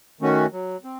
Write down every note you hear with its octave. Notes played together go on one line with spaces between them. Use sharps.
D#3 A3 C#4 F#4
F#3
C4